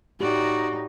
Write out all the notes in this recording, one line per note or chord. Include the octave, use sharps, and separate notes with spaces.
A2 D#4 F#4 G4 D5